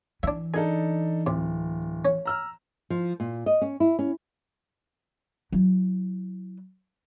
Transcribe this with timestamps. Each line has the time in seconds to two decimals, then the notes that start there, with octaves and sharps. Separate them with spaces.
0.23 E3 D4 E5
0.54 D4 D#4 G#4 A4
1.27 D1 C3
2.05 C#4
2.26 A#5 E6 F6
2.90 F3
3.20 A#2
3.46 D#5
3.62 C#4
3.80 E4
3.99 C#4
5.52 F#3 E4